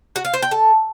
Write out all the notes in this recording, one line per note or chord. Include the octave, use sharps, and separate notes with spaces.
F#4
F5
C5
G5
A4